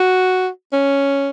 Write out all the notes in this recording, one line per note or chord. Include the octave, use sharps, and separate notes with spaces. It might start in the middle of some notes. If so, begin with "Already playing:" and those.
Already playing: F#4
C#4